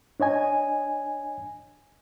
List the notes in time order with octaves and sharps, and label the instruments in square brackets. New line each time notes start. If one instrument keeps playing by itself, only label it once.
[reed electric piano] D4 C#5 D#5 G#5